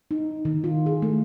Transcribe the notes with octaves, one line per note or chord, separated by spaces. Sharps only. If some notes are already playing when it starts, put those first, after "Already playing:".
D#4
D#3
F4
G#4
A3